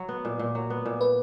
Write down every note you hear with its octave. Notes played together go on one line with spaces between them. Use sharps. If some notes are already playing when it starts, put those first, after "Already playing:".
Already playing: F#3
B3
A#2
A#2
F#3
B3
A#2
B4